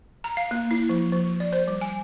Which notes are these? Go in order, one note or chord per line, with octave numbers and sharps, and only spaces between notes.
A#5
F5
A#3
E4
F3
F3
D5
C5
G3
G#5